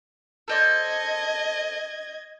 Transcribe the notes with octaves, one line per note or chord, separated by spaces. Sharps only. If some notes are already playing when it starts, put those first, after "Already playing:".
A4 C5 D5 D#5 G#6